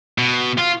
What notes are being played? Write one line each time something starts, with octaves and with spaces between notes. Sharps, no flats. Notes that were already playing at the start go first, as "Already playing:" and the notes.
B2
F4